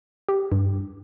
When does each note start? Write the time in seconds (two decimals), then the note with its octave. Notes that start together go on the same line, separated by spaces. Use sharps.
0.29 G4
0.52 G2